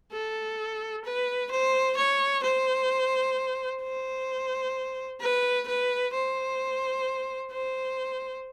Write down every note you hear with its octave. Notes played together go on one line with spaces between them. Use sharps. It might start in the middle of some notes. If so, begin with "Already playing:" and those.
A4
B4
C5
C#5
C5
C5
B4
B4
C5
C5